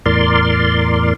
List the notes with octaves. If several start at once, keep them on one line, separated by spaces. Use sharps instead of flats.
E2 A2 A#4 D5 C6